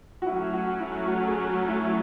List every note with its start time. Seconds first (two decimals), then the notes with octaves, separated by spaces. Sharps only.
0.22 F#4
0.26 F#3 A3 C#4 E4
0.53 F#4
0.80 E4
1.07 F#4
1.28 G#4
1.48 F#4
1.68 E4
1.82 E4